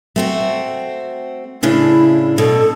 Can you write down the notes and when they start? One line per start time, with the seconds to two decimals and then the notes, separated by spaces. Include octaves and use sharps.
0.16 A3 C4 F#4
1.63 A2 C#3 D4 E4
2.38 B2 A4